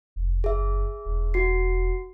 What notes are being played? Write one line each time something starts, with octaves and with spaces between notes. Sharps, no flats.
F1
F#1 G#4 E5
E1
F#4 C7